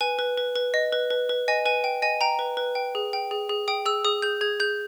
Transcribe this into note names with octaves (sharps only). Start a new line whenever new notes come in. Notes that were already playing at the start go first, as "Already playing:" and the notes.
B4 G#5
B4
B4
B4
D#5
B4
B4
B4
D#5 G#5
B4 G#5
G5
D#5 G#5
G5 A#5
B4
B4
G5
G#4
G5
G#4
G#4
G5 D#6
G#4 E6
G#4 D#6
G#4 G6
G#4 G#6
G#4 G6